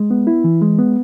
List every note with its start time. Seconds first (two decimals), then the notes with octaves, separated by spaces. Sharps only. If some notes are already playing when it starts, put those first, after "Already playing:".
Already playing: G#3
0.11 B3
0.27 E4
0.44 E3
0.62 G#3
0.79 B3